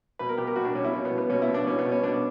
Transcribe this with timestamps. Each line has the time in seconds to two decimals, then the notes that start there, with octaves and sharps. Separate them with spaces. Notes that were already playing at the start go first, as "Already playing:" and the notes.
0.19 B2 B4
0.29 A#4
0.37 B2 G4
0.47 A#4
0.56 B2 F#4
0.65 D4
0.75 B2 C#4
0.84 E4
0.93 B2 C#4
1.05 B3
1.11 B2
1.18 B3
1.30 B2 C#4
1.42 E4
1.48 B2
1.54 D4
1.67 B2 C#4
1.79 B3
1.85 B2
1.92 C#4
2.03 B2 D4